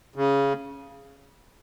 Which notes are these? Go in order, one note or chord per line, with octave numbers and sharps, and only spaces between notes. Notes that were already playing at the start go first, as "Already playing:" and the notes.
C#3